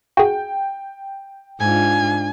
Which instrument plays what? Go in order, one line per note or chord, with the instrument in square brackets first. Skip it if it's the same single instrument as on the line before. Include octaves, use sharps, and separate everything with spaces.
[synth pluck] F#4 G#4 [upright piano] G5
[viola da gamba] G#2 D4 F4 [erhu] G#5